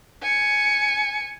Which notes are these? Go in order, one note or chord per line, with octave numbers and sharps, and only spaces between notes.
G#5 C#7